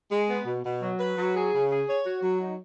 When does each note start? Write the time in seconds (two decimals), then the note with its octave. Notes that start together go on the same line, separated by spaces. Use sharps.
0.11 G#3
0.29 B3
0.46 B2
0.64 B2
0.82 F#3
0.99 B4
1.18 F#3
1.35 G#4
1.53 C#3
1.70 G#4
1.88 C#5
2.05 F#4
2.23 F#3
2.41 D#4